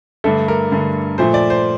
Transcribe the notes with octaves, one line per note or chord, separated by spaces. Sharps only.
G2 D3 A3 A4
A#4
G2 D3 A3
A#2 F3 A3 C5
D5
C5